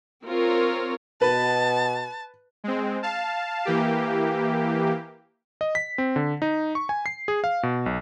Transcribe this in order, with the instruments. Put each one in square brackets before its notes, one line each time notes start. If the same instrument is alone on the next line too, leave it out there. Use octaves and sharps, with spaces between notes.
[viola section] C4 F4 A#4 C#5
[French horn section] B2 [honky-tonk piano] B4 [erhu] A5
[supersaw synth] G#3 C4
F5 A5
E3 A#3 G4
[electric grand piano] D#5
B6
C4
D3
D#4
C#6
G#5
C7
G#4
F5
B2
B1